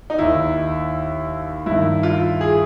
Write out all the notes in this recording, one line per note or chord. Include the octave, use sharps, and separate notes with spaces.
D#4
D#2 D#3 E4
G2 D#3 E4
F4
G#4